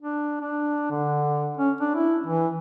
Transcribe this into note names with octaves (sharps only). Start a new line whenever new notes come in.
D4
D4
D3
C#4
D4
E4
E3